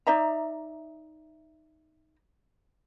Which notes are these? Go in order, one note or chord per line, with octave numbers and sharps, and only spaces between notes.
D#4 D5 E5 A#5